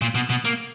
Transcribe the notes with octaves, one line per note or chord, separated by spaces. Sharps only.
A#2
B2
B2
A#3